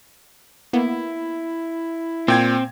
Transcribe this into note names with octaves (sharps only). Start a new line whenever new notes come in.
A#3 B3 E4
A#2 C4 G5 G#6